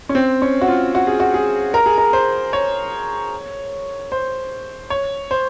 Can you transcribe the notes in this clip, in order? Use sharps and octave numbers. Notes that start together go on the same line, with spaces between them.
C#4
C4
C#4
F#4
F4
F#4
G#4
F#4
G#4
A#4
G#4
A#4
C5
C#5
C5
C#5
C5